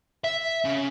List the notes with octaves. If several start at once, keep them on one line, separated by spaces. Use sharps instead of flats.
E5
C#3